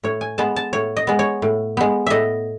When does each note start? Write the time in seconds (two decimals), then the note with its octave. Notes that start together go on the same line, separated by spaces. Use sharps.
0.03 A2 C#5
0.21 G#5
0.38 G#3 B3 A5
0.56 A5
0.73 A2 C#5
0.97 D#5
1.07 G#3 B3
1.19 C#5
1.42 A2
1.77 G#3 B3
2.07 A2 D#5 E5